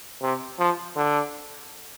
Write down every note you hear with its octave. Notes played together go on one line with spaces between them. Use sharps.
C3
F3
D3